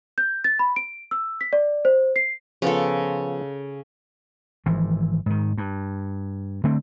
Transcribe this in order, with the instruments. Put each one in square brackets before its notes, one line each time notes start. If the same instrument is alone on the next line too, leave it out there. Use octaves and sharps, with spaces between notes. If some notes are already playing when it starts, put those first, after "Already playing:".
[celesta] G6
A6
B5
D7
E6
B6
D5
C5
C7
[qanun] C#3 A4 [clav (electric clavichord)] F3 B3 F4
[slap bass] G#1 E3 F3
G#2 D#3
G2
D3 A3 C4